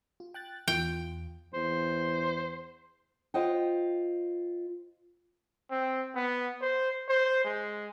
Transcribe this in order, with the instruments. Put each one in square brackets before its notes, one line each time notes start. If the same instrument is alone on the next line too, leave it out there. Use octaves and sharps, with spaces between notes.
[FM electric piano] F4
G5 F#6 A6
[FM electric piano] E2 F4 [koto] G5
[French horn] E2 [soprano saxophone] C5
[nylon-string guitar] F4 C5 D#5 F#5 G5
[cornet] C4
B3
C5
C5
G#3